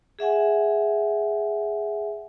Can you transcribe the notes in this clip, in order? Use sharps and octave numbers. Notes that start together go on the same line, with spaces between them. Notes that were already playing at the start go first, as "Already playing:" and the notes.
G#4 E5 F#5 G#5